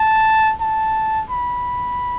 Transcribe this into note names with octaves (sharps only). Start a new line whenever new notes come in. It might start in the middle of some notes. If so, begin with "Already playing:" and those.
Already playing: A5
A5
B5